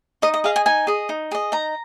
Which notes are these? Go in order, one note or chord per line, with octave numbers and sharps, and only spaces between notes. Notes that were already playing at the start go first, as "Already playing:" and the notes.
D#4 D#5
D#5
G#4 D#5 F5
G#5
D#4 G#5
G#4 D#5
D#4
G#4 D#5
D#4 A#5